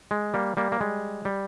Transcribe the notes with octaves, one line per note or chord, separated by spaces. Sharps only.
G#3
G3 A#3
G3 A#3
A#3
G3 G#3
G3